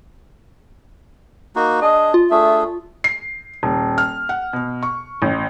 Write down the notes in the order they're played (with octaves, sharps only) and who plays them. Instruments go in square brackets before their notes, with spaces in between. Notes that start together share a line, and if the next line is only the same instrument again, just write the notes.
[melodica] A#3 D#4 F#4
[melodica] D4 G#4 [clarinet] D#5
[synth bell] F4
[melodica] A3 D4 G#4 [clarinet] E5
[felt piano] C7
D#1
F6
F#5
B2
C#6
A1